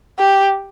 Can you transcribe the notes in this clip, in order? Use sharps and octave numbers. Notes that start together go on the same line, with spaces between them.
G4